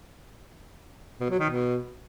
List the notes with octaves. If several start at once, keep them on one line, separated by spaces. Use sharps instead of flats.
B2
F#3
D#3
B2